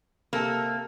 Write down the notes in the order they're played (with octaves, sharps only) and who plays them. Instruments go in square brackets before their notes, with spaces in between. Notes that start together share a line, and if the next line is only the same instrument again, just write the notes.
[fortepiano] C3 A4 A5 [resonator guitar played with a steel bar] A#3